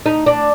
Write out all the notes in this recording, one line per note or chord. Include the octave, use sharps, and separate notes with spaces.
D#4
D4